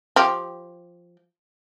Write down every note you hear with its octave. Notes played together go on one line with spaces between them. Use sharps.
F3 G4